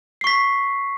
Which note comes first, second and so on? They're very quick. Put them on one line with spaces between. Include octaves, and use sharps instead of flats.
C7 C#6 B6